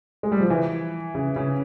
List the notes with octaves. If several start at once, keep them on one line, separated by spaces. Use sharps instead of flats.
G#3
G3
F3
E3
C#3
C#3